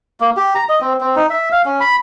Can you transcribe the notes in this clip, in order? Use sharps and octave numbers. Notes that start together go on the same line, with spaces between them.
A#3
G4
A#5
D#5
C4
C4
D#4
E5
F5
C#4
B5